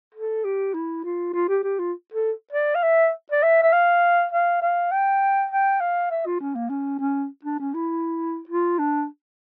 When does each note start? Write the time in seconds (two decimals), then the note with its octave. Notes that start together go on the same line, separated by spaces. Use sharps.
0.15 A4
0.44 G4
0.74 E4
1.04 F4
1.34 F4
1.49 G4
1.63 G4
1.79 F4
2.14 A4
2.53 D5
2.75 F5
2.83 E5
3.32 D5
3.43 E5
3.63 E5
3.72 F5
4.31 F5
4.62 F5
4.91 G5
5.51 G5
5.80 F5
6.11 E5
6.26 F4
6.40 C#4
6.55 A#3
6.70 C#4
6.99 C#4
7.45 D4
7.60 C#4
7.74 E4
8.49 F4
8.79 D4